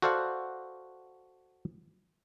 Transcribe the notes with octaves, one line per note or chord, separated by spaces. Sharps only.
F#4 A4 C5 D5 F5 F#5